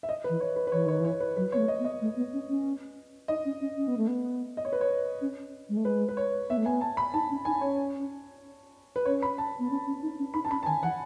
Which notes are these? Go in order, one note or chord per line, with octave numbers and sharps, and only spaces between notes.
E5
D#5
B4
E3
C#5
B4
B4
E3 C#5
D#3 C#5
E3 C#5
B4
F#3 B4
B3 C#5
A3
D#5
B3
D#5
A3
B3
C#4
C#4
D#4 D#5
C#4
C#4
C#4
B3
A3
B3
D#5
C#5
B4
C#5
C#4
G#3
A3
G#3 B4
B4
C#5
B3 E5
A3
B3 G#5
A5
B5
D#4 A5
C#4
D#4 G#5
C#4 C#5
B4
C#4 C#5
B5
A5
B3
C#4
C#4
D#4
C#4
D#4 B5
A5
C#4 B5
A5
D#3 G#5
E3 F#5